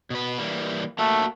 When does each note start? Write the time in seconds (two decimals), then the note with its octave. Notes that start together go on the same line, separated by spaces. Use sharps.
0.10 B2 B4
0.38 E3 G3 A#3
0.98 A3 A#3 F#4 A4